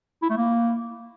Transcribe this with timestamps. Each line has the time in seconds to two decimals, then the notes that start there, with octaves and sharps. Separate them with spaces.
0.22 E4
0.30 A3
0.37 A#3